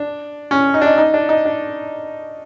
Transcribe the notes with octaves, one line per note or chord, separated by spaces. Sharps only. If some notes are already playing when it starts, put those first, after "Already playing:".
Already playing: D4
C#4
D#4
D4
D#4
D#4
D4
D#4
D4